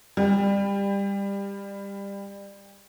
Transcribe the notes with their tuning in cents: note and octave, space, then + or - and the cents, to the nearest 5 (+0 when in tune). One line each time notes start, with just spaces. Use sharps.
G3 +25